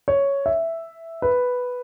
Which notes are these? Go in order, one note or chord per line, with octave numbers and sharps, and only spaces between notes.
C#5
E5
B4